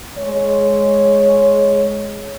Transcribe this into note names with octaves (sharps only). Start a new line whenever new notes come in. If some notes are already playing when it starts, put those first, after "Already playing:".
G#3 C#5